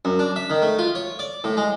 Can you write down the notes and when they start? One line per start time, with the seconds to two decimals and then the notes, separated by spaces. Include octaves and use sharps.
0.05 F#2
0.19 D4
0.36 E5
0.50 D#3
0.62 A3
0.79 F4
0.95 C#5
1.19 D5
1.44 A2
1.57 G#3